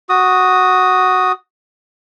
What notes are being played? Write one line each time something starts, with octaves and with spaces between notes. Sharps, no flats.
F#4 D#6